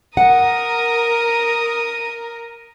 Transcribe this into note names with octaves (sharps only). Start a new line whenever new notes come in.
A#4 F#5 D#6